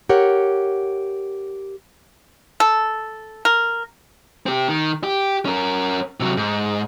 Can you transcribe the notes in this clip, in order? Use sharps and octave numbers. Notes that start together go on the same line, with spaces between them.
G4 A#4 C#5 F#5
A4
A#4
C4 G4
D#3
G4
C#4 A#4
C3 F#3
G#2